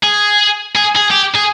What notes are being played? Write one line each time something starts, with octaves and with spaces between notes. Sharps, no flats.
G#4
G#4
G#4
G4
G#4